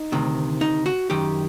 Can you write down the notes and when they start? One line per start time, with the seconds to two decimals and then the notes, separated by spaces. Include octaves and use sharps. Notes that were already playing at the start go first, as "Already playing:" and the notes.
Already playing: D#4
0.12 D2 C3 D#3
0.61 D#4
0.86 F#4
1.10 F#2 D#3 G4